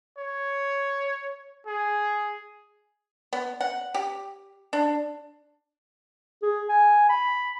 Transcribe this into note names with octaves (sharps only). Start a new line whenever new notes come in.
C#5
G#4
B3
F#5
G4
D4
G#4
G#5
B5